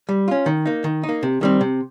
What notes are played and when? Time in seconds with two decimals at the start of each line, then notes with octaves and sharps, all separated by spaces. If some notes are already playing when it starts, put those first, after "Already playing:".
0.09 G3
0.28 C#4 F4
0.46 D#3
0.66 A#3 D#4
0.84 D#3
1.03 D#4
1.09 A#3
1.23 C3
1.41 D#3 G3 C4
1.61 C3